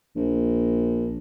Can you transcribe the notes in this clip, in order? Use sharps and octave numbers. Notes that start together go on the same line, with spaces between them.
A#1